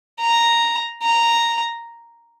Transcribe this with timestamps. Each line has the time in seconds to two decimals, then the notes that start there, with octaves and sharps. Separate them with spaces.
0.21 A#5
1.02 A#5